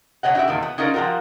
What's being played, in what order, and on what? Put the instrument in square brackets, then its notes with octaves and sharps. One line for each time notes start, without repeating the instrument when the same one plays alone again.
[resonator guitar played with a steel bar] B2 A3 C#5 D#5 F#5
D#4 E4 F#4 G4 E5
E2 A#2 D#3
B3
C#4 D#4 F4 A#4 C5 D5
F3 G3 F4 F#4 A#4